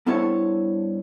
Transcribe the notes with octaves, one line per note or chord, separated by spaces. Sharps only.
G2 B3 E4 A4 C5 C#5